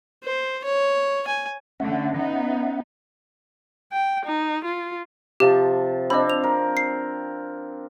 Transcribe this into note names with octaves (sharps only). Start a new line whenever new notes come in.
C5
C#5
G#5
D3 A3 C#4 E5 F#5
B3 D#4
G5
D#4
F4
C3 F3 G4 A5
C4 D4 D#5 B5
F7
A#4
C7